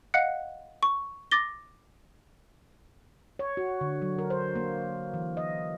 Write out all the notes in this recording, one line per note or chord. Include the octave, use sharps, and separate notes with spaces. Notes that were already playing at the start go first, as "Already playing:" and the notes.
D#5 F5 F#5 F#6 C#7
C#6
D6 A6 A#6 G7
C#5
F#4
D3
F#3
A#4
C5
A#3
E3
D#5